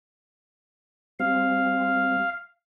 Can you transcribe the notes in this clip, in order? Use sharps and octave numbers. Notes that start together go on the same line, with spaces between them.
G3 C4 F5